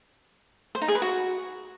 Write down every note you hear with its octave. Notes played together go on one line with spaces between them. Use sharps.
C5
D#4
G#4
B4
F#4